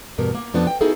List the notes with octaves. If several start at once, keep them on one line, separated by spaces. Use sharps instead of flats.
E2 G2 B2 A#4
A#3
F2 F3 B3 D4 A5
G5
B3 D#4 E4 F#4 G#4 A4